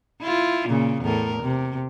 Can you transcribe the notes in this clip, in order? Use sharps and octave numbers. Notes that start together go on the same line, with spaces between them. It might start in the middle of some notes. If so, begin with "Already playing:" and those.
E4 F4
A#2 C#3
E2 A2 A#4
C3